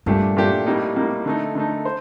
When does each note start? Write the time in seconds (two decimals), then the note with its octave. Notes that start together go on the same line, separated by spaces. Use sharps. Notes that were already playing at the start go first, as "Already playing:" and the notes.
0.06 G2 A#2 A3 D4 G4
0.37 A#2 A3 D4 G4
0.66 A2 G3 A#3 D#4
0.96 A2 G3 A#3 D#4
1.25 D3 A3 D#4
1.55 D3 A3 D#4
1.85 C5